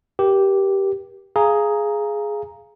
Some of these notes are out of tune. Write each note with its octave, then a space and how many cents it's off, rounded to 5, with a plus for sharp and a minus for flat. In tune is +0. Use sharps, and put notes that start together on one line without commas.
G4 -5 A#4 +35
G#4 +5 F5 -10 A#5 +0